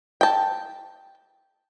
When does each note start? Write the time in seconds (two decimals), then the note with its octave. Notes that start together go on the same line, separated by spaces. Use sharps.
0.21 G5 A5